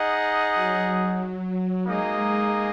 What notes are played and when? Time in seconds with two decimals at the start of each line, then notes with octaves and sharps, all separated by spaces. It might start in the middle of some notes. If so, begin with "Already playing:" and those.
Already playing: D#4 G#4 D#5 F#5
0.55 F#3
1.86 G#3 A#3 D#4 G#4 D#5